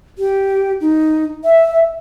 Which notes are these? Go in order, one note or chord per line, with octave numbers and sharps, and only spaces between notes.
G4
D#4
E5